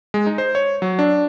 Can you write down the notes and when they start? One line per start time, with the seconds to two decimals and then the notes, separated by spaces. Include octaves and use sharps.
0.14 G#3
0.27 D#4
0.38 C5
0.55 C#5
0.82 F#3
0.99 D4